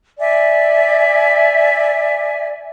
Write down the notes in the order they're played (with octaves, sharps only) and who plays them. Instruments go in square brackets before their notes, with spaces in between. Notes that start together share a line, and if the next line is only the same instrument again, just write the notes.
[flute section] D5 E5 G#5